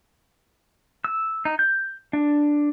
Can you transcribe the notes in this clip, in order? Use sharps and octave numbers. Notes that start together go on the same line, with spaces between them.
E6
D#4
G6
D4